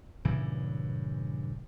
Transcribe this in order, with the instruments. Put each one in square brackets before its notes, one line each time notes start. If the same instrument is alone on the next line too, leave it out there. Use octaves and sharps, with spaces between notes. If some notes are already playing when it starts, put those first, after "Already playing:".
[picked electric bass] G2 A#2 C#3 E3